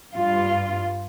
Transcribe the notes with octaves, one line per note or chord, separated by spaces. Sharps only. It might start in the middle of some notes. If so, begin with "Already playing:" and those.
G2 F4